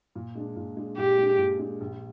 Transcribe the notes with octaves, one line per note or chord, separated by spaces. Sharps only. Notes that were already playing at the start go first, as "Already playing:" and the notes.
A#2
G#3 D4
A#2
G#3 D4
A#2 G4
G#3 D4
A#2
G#3 D4
A#1